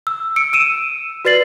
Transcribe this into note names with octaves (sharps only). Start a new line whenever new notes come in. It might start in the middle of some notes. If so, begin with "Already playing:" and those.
E6
E6 C#7 D7
E6 D#7 E7
F#4 B4 D5 A6 C7 F#7